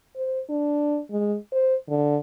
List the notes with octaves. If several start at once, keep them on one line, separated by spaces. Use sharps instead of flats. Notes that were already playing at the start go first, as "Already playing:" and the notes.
C5
D4
G#3
C5
D3